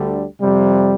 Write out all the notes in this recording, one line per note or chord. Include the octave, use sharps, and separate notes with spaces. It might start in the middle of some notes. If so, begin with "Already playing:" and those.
Already playing: D2 D3 G3
F2 C3 G3